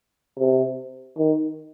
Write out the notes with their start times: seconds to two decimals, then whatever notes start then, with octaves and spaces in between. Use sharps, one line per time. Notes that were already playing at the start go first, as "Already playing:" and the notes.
0.39 C3
1.18 D#3